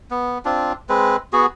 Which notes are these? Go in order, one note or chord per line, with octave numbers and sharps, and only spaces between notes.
B3
C4 D4 F4
G#3 C4 B4
B3 F#4 G#4